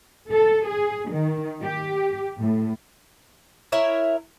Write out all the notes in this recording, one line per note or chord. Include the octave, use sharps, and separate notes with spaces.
A4
G#4
D#3
G4
A2
E4 A#4 C#5 E5